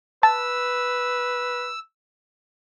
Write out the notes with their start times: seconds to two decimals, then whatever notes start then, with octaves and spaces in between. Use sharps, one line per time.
0.23 B4 A5 E6